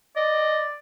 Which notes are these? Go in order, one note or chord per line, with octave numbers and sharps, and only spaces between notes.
D5 D#5